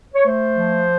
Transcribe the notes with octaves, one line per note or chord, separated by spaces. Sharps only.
C#5
A3 C5
F3